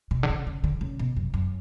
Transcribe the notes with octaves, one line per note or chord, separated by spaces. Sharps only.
B2
D3
C#3
C#3
D3
C#3
B2
F#2
F#2